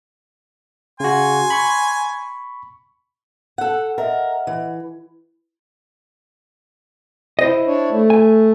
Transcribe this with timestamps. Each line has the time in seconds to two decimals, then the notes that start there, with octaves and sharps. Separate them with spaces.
1.00 C#3 F#4 G#5 C6
1.50 B5 C#6
3.58 A4 F#5
3.98 A#4 D#5 E5 F#5
4.47 E3
7.39 E4 C5 D#5
7.67 D4 C#5
7.91 A3
8.10 G#5